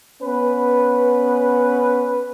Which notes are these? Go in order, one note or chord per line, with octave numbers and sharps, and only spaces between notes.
B3 C#4 B4